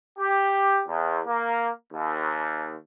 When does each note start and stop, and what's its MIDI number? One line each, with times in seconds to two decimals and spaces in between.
0.18 0.81 67
0.87 1.19 40
1.27 1.68 58
1.92 2.73 39